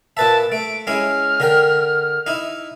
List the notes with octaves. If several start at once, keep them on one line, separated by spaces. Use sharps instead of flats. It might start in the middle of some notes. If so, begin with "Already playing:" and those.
A#2 B4 E5 A5
A3 D7
G#3 C#4 E4 F6
D3 A#4 G5
D#4 E4